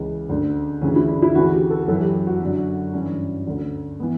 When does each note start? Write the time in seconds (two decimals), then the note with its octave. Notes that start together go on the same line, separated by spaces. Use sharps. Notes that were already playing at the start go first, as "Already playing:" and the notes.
Already playing: C#2 C#3 E3 C#4
0.29 D2 D3
0.81 D2 C#3 E3 C#4
0.96 E4
1.08 D4
1.22 E4
1.35 D2 C#3 E3 F#4
1.53 G4
1.70 A4
1.88 F#2 E3 A4
2.01 G4
2.27 F#4
2.41 F#2 D3
2.93 G2 E3 C#4
3.47 D2 D3
4.00 E3 B3